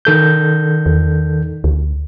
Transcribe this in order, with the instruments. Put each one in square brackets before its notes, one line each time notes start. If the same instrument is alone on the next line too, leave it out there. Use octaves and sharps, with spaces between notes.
[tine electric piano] D#3 A4 G6
[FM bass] E2
D2